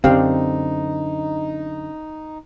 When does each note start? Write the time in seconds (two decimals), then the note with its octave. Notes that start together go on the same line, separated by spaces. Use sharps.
0.04 F#2 D3 C4 D#4 G4 F5